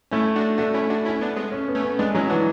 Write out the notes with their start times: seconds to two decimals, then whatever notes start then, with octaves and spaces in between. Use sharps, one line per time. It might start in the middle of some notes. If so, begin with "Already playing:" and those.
0.12 A3 C#4 E4
0.36 D4 F#4
0.58 A3 D4 F#4
0.74 C#4 E4
0.90 D4 F#4
1.06 C#4 E4
1.21 B3 D4
1.36 G#3 B3
1.52 C#4
1.68 B3
1.75 A3 C#4
1.83 B3
1.99 G#3 B3 D4
2.14 F#3 C#4 E4
2.30 E3 D4 F#4